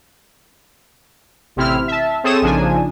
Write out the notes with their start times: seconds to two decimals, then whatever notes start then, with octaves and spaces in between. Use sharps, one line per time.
1.56 A1 C3 C4 E4 F6
1.88 E5 A5
2.24 C4 G#4 A4 C#5 D#6 E7
2.42 A#1 C#3 F3 D4 D#4 G#5